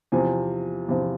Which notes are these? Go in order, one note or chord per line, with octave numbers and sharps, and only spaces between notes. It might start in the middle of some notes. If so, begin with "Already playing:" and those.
E2 C3 F3 G#5
E2 C3 F3